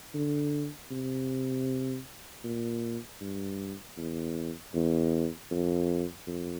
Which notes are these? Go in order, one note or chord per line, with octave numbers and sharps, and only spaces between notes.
D3
C3
A#2
G2
E2
E2
F2
F2